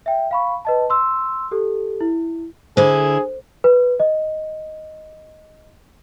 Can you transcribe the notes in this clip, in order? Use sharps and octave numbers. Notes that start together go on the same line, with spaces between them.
E5 G5
F5 B5 C#6
B4 D#5 A5
C6 E6
G4 A4
E4
D3 E4 G#4 A4 C5
B4
D#5